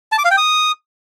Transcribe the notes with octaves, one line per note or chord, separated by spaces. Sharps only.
A5
D6
F5
G5
D#6